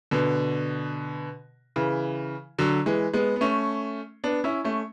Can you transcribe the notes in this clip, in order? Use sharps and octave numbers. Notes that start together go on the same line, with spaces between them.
B2 D3
C#3 E3
D3 F#3
E3 G#3
G#3 B3
B3
A3 C#4
B3 D4
C#4 E4
A3 C#4